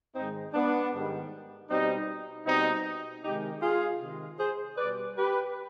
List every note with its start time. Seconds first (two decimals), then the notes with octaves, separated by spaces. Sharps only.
0.15 G#2 D#3 G#3 C4 D#4
0.53 B3 D4
0.92 G#2 D#3 G3
1.69 B2 G3 C4 D#4
2.46 B2 G3 C4 D#4
3.24 C3 D#3 G#3 D#4 G4
3.61 F4 G#4
4.00 C3 D#3 G#3
4.38 G#4 C5
4.77 B2 G3 B4 D5
5.16 G4 B4